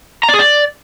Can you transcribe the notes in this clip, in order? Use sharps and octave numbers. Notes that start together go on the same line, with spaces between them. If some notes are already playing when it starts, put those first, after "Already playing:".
A#5
D5
G#4
D5